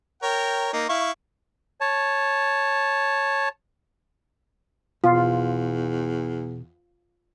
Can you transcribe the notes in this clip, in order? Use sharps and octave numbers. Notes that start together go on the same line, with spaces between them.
A#4 C#5 G5
A#3 D#4
E4 F5 C#6
C#5 A5
E2 B2 F4